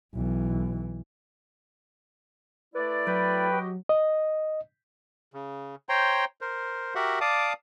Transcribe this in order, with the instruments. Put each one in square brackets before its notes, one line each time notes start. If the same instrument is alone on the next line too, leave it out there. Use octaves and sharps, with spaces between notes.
[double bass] B1 E3
[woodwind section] A3 E4 D5 [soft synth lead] B4
[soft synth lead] F#3 [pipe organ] B4 G5
[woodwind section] F#4 G4 D#5
[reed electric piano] D#5
[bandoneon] C#3
C5 C#5 G5 A#5 C6
A#4 C5
F#4 G4 A#4 E5 F#5
D5 F5 A5 D6 D#6